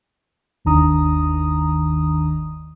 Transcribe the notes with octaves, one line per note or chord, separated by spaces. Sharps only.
G1 D#2 D#3 D4 A#5 D#6